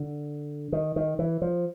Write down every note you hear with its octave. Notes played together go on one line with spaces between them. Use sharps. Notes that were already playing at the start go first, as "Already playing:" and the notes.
Already playing: D3
D#3
D#3
E3
F3